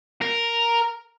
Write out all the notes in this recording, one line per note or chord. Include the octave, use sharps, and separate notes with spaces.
A#4